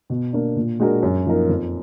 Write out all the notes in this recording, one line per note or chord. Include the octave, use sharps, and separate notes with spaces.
B2
A#3 D4
A#2
G#3 D4 F#4 A#4
F#2
F3 A#3 D#4 A#4
F2